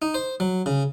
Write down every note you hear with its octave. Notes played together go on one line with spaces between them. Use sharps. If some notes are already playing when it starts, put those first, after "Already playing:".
D#4
C5
F#3
C#3